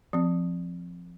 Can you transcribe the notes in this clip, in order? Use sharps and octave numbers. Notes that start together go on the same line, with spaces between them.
F3 C4